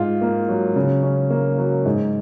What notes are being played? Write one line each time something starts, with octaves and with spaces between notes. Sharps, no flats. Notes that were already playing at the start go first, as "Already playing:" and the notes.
Already playing: G#2 F4
A#3
F#3
C#3
C#4
A#3
F#3
G#2